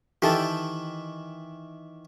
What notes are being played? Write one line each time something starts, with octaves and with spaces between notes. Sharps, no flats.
D#3 E3 G4 A4 A5